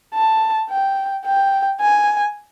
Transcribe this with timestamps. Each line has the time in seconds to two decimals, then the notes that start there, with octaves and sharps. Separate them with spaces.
0.14 A5
0.70 G5
1.26 G5
1.81 G#5